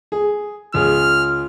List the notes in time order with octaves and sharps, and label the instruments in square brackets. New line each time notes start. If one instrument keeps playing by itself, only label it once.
[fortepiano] G#4
[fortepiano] C#2 G#4 [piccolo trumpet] F6